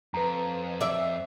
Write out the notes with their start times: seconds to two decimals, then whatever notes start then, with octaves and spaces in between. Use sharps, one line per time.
0.14 F2 B4 A#5
0.81 D5 E5